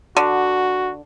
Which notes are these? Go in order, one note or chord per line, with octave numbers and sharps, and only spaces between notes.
D3 F#4